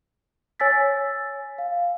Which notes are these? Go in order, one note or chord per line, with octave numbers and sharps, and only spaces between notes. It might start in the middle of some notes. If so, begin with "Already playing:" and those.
C#5 G#5 E6 A6 B6
F5